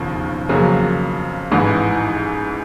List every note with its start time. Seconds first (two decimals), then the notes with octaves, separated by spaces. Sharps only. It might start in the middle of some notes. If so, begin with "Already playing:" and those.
Already playing: E1 D#2 C#3 F3
0.49 F2 C#3 F#3 A#3
1.52 A1 G#2 E3